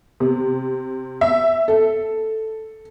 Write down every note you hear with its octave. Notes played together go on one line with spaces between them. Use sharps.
C3
E5
A4